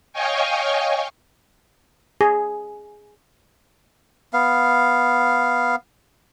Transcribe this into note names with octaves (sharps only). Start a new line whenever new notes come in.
C#5 D#5 F5 G5 G#5 C#6
G#4
B3 F5